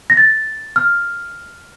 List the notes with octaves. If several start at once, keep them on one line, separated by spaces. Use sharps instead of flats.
A#6
A6
F6